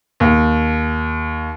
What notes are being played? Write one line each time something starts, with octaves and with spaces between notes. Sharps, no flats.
D#2